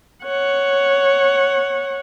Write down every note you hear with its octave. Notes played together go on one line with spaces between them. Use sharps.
C#5 F#5